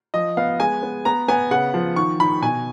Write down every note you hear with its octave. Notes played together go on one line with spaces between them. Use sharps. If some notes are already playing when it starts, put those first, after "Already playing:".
F3 D#5
B3 F5
G#3 G#5
B3
B3 A#5
B3 G#5
C#3 F#5
F3
D#3 C#6
D#3 B5
B2 G#5